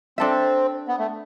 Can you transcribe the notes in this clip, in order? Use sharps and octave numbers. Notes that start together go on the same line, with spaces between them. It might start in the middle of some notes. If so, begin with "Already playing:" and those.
C4 D4 A4 E5
B3
A3